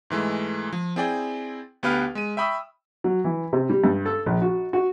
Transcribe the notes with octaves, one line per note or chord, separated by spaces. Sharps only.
G#2 E3 G#3 A3
F3
C4 E4 G#4 D5 G5
D2 B3 G4 B4 F5 F6
G#3 D#7
E5 G5 B5 C#6 D#6 E6
F#3
E3
C3
G3
G2
A4
A#1
F#4
F#4